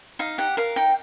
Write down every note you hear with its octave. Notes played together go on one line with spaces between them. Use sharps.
D#4 F5
G4 F#5
A#4 F5
D#4 G5